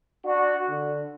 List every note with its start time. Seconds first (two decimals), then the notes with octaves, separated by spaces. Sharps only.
0.24 D4 F#4
0.68 D3